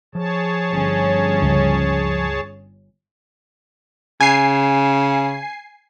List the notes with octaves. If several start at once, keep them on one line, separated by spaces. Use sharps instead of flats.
F3 G#4 C#5 A5
G1 C#4
C#2
C#3 G#5 C7